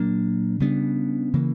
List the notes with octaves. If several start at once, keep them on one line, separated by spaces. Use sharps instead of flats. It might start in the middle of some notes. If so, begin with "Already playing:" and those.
Already playing: A#2 F#3 A#3 D4
C#3 G3 B3 D4
C#3 E3 A#3